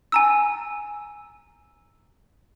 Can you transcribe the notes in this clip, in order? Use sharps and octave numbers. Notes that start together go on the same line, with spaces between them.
G#5 A#5 E6